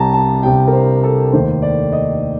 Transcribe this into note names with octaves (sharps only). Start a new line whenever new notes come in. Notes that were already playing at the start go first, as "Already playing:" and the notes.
Already playing: C2 C3 G3 A5 A#5
A5
C2 C3 G3 G5
A#4
C5
A4
F1 D#2 D#3 C5
D5
D#5